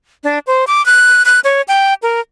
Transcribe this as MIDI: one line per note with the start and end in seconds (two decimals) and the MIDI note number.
0.24 0.39 62
0.47 0.65 72
0.67 0.84 86
0.86 1.23 90
1.26 1.40 90
1.44 1.62 73
1.68 1.94 79
2.03 2.20 70